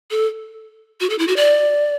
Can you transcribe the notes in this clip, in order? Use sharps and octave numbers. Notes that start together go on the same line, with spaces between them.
A4
F#4
A4
E4
F#4
D5